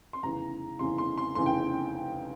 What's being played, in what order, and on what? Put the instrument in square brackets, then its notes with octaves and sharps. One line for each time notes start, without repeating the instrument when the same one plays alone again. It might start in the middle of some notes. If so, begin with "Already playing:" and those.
[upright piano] C6
F1 E2 C#3 E3 A#5
F1 E2 C#3 E3 C6
C6
C6
F1 E2 C#3 E3 C6
G5